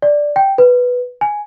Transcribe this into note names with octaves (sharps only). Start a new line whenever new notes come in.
D5
G5
B4
G#5